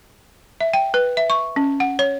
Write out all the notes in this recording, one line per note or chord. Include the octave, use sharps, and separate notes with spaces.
E5
G5
B4
E5
C#6
C#4
F#5
C#5